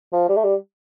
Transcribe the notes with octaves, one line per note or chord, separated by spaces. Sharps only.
F3
G3
A3
G3